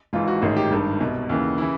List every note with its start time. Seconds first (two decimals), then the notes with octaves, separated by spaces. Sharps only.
0.13 G#1 G#2 E3 F4
0.28 F#4
0.42 A1 G#2 D#3 G#4
0.56 G4
0.71 G#1 G2 D#3
1.00 C2 B2
1.29 D#2 C#3 E3
1.58 C#3 E3 E4